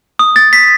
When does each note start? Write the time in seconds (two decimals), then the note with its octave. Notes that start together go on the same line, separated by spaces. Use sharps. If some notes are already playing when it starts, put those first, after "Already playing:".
0.19 D#6
0.36 A6
0.53 B6